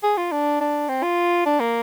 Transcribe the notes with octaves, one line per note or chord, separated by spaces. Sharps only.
G#4
F4
D4
D4
C4
F4
D4
A#3